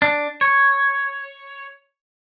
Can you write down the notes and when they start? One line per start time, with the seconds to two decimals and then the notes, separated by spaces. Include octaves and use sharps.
0.02 D4
0.41 C#5